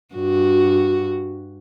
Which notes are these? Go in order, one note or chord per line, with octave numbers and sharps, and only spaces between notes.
G2 F#4